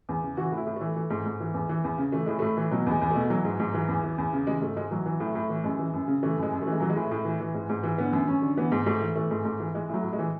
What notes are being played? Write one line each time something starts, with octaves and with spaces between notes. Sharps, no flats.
E2
C#3
E3 F#4
A2
E4
A2
E3 A3
E3
G#2
G#2
E3
E2
E3
E2
C#3
E3 A3
A2 G#3
A2 A3
E3
B2 F#3
E2 G#3
E2
B2 A3
E3 F#3
G#2
G#2
E3
E2
E3
E2
C#3
E3 G#3
G#2 A3
G#2 G#3
E3 F#3
E3
A2
A2
E3
F#2 G#3
E3
F#2
C#3
E3 A3
F#2 G#3
F#2
A3
E3 G#3
E3 F#3
G#3
A2
A2
E3
E3
G#2
G#2
E3
D3 B3
F#2
F#2 C#4
D3
E3 B3
G#2
G#2 A3
E3
E3 A3
G#2
G#2
E3
E3 G#3
A2 F#3
A2
G#3
E3